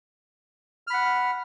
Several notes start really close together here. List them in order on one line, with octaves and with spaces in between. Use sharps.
F6 B5 F#5